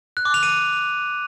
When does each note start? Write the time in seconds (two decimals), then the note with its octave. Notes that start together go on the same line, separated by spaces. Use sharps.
0.17 F#6
0.25 D6
0.34 F7
0.43 D#7